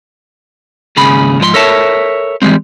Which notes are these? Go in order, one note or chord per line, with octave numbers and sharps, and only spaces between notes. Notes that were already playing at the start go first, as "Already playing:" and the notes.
D#2 G#2 C#3 G#4 B5
G#2 F3 B4 C6
A4 A#4 C#5 E5 A5
E3 F3 G3 G#3 C4